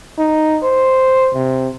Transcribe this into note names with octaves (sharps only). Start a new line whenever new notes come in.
D#4
C5
C3